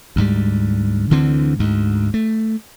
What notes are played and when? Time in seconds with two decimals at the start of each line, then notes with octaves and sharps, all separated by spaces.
0.16 D2 G#2 G3
1.10 D2 D3 E3 C4
1.59 D2 G#2
2.14 A3